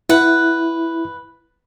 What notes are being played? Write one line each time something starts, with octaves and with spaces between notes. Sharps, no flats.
E4 B4 F#5